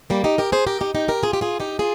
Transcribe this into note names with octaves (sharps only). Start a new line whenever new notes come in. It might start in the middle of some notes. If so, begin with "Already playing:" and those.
G3 A#3
D#4 G4
G4 A#4
G#4 C5
G4 A#4
D#4 G4
D#4 G4
G4 A#4
F4 G#4
G4
F4 G#4
D#4 G4
F4 G#4